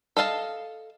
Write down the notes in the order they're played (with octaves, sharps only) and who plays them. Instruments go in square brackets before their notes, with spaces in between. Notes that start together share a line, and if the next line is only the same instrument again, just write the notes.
[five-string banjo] A4 D#5 F5 A5